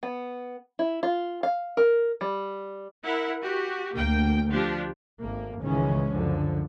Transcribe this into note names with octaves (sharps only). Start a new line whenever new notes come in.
B3
E4
F4
F5
A#4
G3
E4 A#4 F#5
F#4 G4
D2 A#3 G5
F3 D4 G4
G#1 A3 A#3
C#2 A2 D#3 E3 G#3 C#4
C#2 F#2 D3 F3